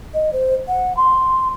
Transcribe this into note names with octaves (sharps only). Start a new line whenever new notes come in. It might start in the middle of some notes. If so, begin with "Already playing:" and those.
D#5
C5
F#5
C6